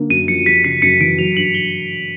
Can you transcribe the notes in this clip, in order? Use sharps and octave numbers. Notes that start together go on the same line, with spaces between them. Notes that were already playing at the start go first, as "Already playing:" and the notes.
Already playing: D3 A#3
F#2 D#7
F3 C#7
G3 B6
C#3 C7
F#2 C#7
E3 D7
F#3 F7
G2 F#7
G7